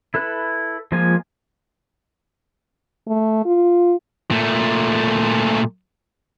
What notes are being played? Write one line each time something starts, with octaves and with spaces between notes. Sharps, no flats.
E4 A4 B4 F#6
F3 G#3 A#3 F4 G#5
A3
F4
A#2 A3